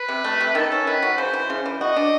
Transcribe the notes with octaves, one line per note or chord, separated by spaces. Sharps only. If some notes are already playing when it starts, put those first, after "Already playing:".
Already playing: B4
C3
A3
C3
D#3 A4
C#4
D#3 B4
F#3
C#3 C5
E3
C#3
E3
F#4 D#5
D4